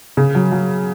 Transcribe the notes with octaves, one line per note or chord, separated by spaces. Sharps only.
C#3
F#3
F#3